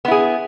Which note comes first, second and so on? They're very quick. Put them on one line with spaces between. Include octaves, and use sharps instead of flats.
B3 E4 G#4